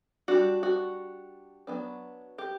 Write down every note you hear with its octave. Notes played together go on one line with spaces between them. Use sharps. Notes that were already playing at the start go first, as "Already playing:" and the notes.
G3 D4 F#4
F#4
F#3 B3 D4
G4